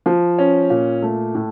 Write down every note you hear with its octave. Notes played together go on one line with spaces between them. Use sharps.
F3
C#4
A#2
A3
A2